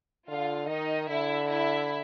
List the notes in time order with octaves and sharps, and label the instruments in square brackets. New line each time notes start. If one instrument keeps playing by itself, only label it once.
[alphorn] D3 [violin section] F4 F5
[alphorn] D#3 [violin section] D#4 D#5
[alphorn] D3 [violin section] E4 E5
[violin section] E4 E5